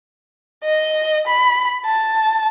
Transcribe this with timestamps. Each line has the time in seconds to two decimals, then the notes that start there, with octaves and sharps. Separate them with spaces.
0.64 D#5
1.27 B5
1.85 A5